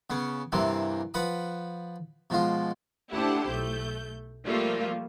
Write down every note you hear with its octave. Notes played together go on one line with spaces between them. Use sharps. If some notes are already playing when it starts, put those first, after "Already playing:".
C#3 B3 C#4
G2 C3 E3 G3 A#3 C4
F3 B4 F#5 B5 D#6
B2 F3 G#3 F4
A3 D4 E4 G4 C5 F#5
B1 A3 G6
F3 G3 A3 A#3 F4